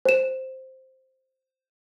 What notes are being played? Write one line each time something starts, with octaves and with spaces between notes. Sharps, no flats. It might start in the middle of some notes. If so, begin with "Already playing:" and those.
C5 E7